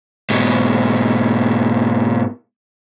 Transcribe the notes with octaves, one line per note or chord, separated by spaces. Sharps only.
G#2 B2